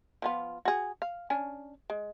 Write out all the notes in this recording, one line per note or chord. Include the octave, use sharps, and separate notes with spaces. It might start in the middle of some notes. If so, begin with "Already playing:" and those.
F3 B3 F4
F#4 G#4
F5
C#4 D4 G#5
G#3